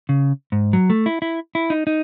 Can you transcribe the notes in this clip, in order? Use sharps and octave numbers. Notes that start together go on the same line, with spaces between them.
C#3
G#2
F#3
A3
E4
E4
E4
D#4
D#4